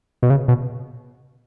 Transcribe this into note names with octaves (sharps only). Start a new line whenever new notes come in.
B2
C#3
B2